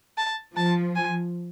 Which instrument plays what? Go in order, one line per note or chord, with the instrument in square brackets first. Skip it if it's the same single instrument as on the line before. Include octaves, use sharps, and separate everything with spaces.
[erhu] A5
[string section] F3 [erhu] A5
[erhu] G#5